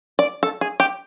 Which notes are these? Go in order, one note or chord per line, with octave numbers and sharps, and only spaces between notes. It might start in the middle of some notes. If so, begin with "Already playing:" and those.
D5
A4
G#4
G4